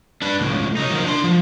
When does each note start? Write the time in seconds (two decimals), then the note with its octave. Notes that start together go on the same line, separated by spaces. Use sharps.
0.22 D4 B4
0.41 C#2 A2
0.77 F#3 D#4
0.91 D#3 F3
1.06 D4 C6
1.24 F3